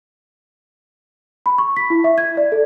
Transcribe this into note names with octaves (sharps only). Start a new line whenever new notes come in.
B5
C#6
B6
E4
E5
G#6
D5
A4